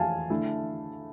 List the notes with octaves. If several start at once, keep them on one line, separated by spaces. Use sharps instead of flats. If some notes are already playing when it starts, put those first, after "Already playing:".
Already playing: F3 A3 E4 F5 G#5 A5
D3 A3 E4